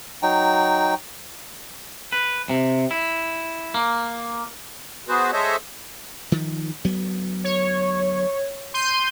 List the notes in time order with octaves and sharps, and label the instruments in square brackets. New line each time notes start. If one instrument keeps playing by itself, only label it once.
[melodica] F#3 D#4 G5
[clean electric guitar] B4
C3
E4
A#3
[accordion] B3 F#4 G#4 B4 C5
G#3 A4 C5 C#5 D#5 E5
[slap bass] D#3 F3
D2 F#3 B3
[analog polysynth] C#5
C6 G6 D#7